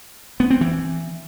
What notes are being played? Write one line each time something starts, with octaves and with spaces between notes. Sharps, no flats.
B3
C4
E3